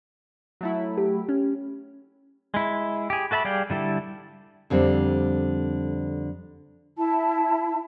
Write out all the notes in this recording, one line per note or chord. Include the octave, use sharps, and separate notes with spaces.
F#3 A3 E4
G4
C#4
G#3 E4
G4 G#4
F#4 A4 E5 A5 B5
G3 G#4 D5 F5 G5
D3 G3 E4 A4
F2 D3 G3 C4
E4 A5